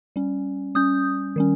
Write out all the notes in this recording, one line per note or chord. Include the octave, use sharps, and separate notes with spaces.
G3 C#4
G3 C#4 D#6 G6
D#3 G3 C#4